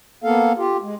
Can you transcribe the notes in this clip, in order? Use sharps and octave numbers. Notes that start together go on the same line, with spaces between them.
A#3 B3 A4 F5
F4 G4
G#3